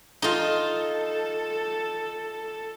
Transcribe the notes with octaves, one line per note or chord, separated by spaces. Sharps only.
D#4 F4 A4